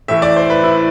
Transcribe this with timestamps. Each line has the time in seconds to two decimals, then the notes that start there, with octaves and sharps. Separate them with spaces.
0.08 A2 E3 A3 E5
0.22 D5
0.36 C5
0.50 B4
0.64 E4